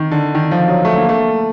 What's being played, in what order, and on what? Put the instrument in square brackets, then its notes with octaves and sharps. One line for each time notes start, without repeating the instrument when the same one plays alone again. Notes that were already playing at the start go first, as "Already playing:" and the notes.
Already playing: [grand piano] D#3
D3
D#3
F3
F#3
A3
A#3
A3